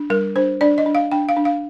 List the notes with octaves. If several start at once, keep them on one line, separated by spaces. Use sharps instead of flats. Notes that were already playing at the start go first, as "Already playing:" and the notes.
Already playing: D4
G3 A#4
D4 C5
D4 D5
D#5
D4
F5
D4 G5
F5
D4
F5